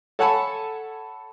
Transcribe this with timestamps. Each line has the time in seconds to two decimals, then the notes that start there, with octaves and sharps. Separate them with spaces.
0.19 A4 C#5 F#5 G#5 A5 B5